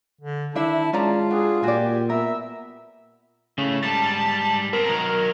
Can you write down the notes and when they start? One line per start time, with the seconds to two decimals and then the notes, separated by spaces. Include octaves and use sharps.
0.21 D3
0.55 D#3 D4 E4 E5 A5
0.93 G#3 C#4 F4 D5 A#5
1.31 D4 F#4 G#4
1.63 A#2 F#4 G4 D5 G#5
2.09 B3 A#4 E5
3.58 A2 C#3 A3
3.83 G#2 G3 A5
4.73 B3 C4 A#4
4.88 D#3 F#3